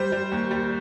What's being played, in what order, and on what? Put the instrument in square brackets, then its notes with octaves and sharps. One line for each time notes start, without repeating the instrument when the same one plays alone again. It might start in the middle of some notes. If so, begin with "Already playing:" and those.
Already playing: [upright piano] G3 C5
G3
D#2
G3